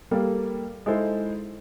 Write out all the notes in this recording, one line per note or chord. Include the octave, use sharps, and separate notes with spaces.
G3 A#3 A4 F5
G#3 D#4 E4 A4 C5